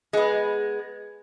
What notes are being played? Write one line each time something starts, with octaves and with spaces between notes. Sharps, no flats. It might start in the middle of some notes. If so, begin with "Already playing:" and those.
G#3 B3